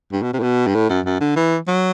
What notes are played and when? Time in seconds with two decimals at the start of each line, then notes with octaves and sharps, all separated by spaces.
0.12 G2
0.23 B2
0.34 C3
0.39 A2
0.43 B2
0.67 G2
0.75 A2
0.90 F#2
1.06 F#2
1.21 D3
1.36 E3
1.68 F#3